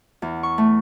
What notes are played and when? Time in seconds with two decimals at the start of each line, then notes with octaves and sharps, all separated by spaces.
0.22 E2
0.43 C#6
0.58 A3